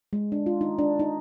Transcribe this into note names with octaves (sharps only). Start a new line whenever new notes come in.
G#3
D4
F4
D#4
D4
D#4